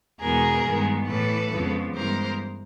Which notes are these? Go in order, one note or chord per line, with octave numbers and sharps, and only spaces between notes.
E2 B2 G#3 B3 G#4 A#4
G2 D#3 G#3 B3
A2 E3 A3 A4 B4
F2 C#3 F3 G#3 B3
G2 E3 G#3 B3 A#4 C5